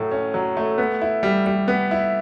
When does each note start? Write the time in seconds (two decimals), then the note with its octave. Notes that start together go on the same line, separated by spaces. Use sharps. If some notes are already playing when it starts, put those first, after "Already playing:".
Already playing: A2 F#3 A3
0.11 C#4
0.34 F#3
0.57 A3
0.78 B3
1.01 E4
1.23 G3
1.46 G3
1.68 B3
1.91 E4